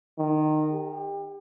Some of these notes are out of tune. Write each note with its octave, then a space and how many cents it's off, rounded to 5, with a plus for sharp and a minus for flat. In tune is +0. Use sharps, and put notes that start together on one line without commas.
D#3 -20
G4 +30